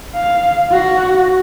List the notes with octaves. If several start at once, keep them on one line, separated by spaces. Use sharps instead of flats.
F5
F#4